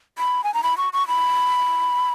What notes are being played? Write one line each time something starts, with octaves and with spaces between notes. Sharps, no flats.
B5
G#5
A#5
B5
C#6
C#6
B5